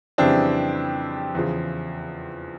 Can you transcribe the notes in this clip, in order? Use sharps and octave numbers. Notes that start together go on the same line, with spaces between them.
F2 C#3 E3 G3 C4 D4
E2 C#3 F3